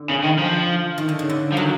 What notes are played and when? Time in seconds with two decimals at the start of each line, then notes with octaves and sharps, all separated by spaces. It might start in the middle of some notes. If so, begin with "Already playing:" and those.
Already playing: D3
0.09 C#3
0.24 D#3
0.39 F3
0.98 D#3
1.08 D3
1.19 C#3
1.29 D3
1.52 F3
1.57 D#3 F#3